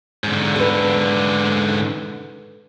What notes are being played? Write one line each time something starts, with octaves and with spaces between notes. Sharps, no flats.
G#2 D3
A4 B4